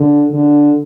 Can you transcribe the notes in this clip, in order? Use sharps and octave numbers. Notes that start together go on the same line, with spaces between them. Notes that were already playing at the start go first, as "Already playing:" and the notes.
Already playing: D3
D3